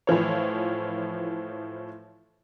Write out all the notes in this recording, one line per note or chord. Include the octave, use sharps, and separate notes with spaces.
A2 E3 F3 C#5